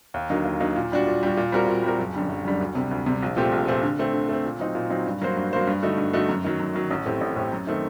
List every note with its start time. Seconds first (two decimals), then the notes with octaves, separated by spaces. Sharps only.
0.14 D#2
0.30 D3 F#3 A#3 D#4
0.45 D#2
0.60 D3 F#3 A#3 D#4
0.76 A#2
0.92 G3 D4 F#4
1.07 A#2
1.23 G3 D4 F#4
1.37 A#2
1.52 G3 C4 F#4 A#4
1.68 A#2
1.83 G3 C4 F#4 A#4
1.99 F#1
2.14 F#2 D3 G3
2.29 F#1
2.45 F#2 D3 G3
2.61 D2
2.75 C3 G3
2.91 D2
3.06 C3 G3
3.22 A#1
3.37 A#2 A3 C4 G4
3.52 A#1
3.68 A#2 A3 C4 G4
3.83 D3
3.99 A3 C4
4.13 D3
4.29 A3 C4
4.45 A#2
4.60 F#3 C4 D#4
4.75 A#2
4.90 F#3 C4 D#4
5.06 G2
5.22 F#3 A#3 F#4 C5
5.37 G2
5.53 F#3 A#3 F#4 C5
5.67 G2
5.83 D3 A3 D#4 F#4
5.98 G2
6.13 D3 A3 D#4 F#4
6.29 F#2
6.44 D#3 F#3
6.60 F#2
6.75 D#3 F#3
6.91 A1
7.05 A2 A3 C4 G4
7.21 A1
7.36 A2 A3 C4 G4
7.53 F#2
7.67 D#3 A3 C4